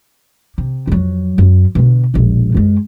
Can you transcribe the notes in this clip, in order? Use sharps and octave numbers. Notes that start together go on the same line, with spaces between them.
C3
F2 F#3
F#2
B2 D3
E1 A#1
F#2 G#3